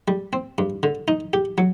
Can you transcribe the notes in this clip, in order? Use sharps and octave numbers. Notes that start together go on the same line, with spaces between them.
G3
C4
G2
D3
D#4
G4
F#3